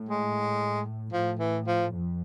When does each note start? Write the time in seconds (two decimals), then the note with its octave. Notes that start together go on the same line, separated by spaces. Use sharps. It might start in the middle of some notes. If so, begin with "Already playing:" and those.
Already playing: A2
0.09 G#3
1.12 A2 F3
1.39 E3
1.67 F3
1.94 F2